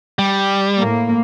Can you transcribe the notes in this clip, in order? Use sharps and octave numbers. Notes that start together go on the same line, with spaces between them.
G3
A2 A#3